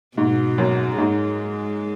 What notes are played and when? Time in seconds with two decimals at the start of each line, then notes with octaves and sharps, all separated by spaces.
0.17 G#2 B2
0.58 F#2
0.98 G#2 G#3